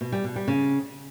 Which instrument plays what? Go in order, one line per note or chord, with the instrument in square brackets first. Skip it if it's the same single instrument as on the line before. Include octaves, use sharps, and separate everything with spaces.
[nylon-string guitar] B2
G3
B2
G3
C#3